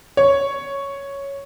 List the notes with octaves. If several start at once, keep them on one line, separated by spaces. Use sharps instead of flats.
C#5